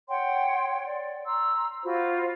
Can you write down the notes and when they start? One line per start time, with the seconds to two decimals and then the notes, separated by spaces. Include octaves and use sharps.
0.08 C#5 F#5 G5 C6
0.87 D5
1.26 A#5 C6 E6
1.85 F4 F#4 C5 B5